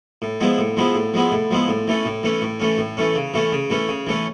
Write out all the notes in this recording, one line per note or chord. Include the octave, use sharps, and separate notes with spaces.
A2
F3 G#3 B3 E4
A2
F3 G#3 B3 E4
A2
F3 G#3 B3 E4
A2
F3 G#3 B3 E4
A2
E3 A3 C#4
A2
E3 A3 C#4
A2
E3 A3 C#4
A2
E3 A3 C#4
C#3
E3 A3 C#4
C#3
E3 A3 C#4
C#3
E3 A3 C#4